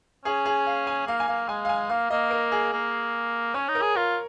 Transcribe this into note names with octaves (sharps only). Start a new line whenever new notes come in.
C#4 G#4
G#4
F5
G#5
A#3 F5
G#5
A#3 F5
G#3 G#5
F5
G#5
A#3 F5
A#3 D#5
A#4
G#4
A#3
C#4 C#5
D#4
A#4
G#4
F4 A#4